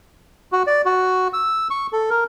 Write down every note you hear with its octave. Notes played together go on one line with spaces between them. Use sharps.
F#4
D5
F#4
E6
C#6
A4
A#4